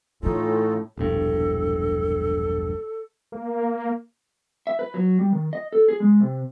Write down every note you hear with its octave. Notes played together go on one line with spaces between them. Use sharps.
A2 E3 C#4 D#4 F4 A4
E1 A#1 G2 A4
A#3
E5
B4
F#3
G3
D#3
D#5
A4
G#4
G#3
C3